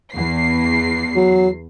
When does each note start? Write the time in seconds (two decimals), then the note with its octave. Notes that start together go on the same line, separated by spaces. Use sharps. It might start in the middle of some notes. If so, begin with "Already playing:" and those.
0.14 E2 C7
1.16 F#3